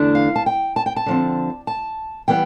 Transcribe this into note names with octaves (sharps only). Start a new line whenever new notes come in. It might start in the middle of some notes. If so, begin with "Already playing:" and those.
Already playing: E2 D3 A3 D4
F5
A5
G5
A5
G5
A5
D3 F3 C4
A5
E3 G3 B3 G5